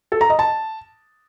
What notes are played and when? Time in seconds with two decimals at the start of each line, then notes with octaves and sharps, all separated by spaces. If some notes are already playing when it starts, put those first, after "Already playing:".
0.12 A4
0.21 A#5
0.30 D#5
0.39 A5